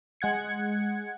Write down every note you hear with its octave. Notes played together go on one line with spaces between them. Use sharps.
G#3 F#5 G#6 C#7